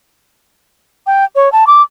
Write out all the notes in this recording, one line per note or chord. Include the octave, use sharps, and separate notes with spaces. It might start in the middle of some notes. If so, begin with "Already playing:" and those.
G5
C#5
A5
D6